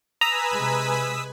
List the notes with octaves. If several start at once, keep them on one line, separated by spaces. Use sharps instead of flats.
B4 G#5 A#5 B5 D#6 E6 B6
C3 G#3